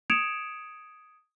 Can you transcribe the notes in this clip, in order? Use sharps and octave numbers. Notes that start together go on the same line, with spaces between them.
D#6 G#6 C#7 D7 E7 F7